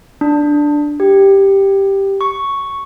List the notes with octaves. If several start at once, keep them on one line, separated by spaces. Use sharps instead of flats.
D4
G4
C#6